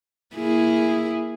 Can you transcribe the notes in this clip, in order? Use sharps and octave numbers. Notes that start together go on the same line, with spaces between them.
A#3 E4 G#4